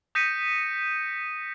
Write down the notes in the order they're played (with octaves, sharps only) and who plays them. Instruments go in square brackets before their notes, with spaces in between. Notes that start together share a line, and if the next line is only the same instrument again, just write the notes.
[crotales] D#6 G6 A#6 B6 C#7 D#7